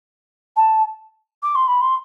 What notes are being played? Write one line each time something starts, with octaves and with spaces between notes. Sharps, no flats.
A5
D6
C6
B5
C6